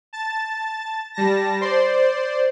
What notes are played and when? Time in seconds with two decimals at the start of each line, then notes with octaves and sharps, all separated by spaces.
0.13 A5 A6
1.14 G3 A5 A#6
1.61 C5 D5 C6